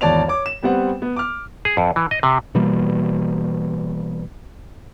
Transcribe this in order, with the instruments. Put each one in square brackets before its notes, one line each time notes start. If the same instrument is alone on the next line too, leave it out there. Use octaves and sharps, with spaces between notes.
[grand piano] G#1 E2 C#5 D5 A5 F7
C#5 D6
E7
G3 B3 C4 F#5
B3
D6 F6
[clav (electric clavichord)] G#4
F2
E3
D#5
C3
[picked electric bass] B2 E3 G3 A#3